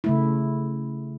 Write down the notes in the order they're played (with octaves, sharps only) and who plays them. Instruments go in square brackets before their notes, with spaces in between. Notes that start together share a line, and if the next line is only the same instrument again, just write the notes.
[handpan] C#3 A3 E4